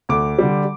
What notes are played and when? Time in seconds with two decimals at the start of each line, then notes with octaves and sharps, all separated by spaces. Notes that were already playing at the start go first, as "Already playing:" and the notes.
0.09 D2 D6
0.38 D3 G3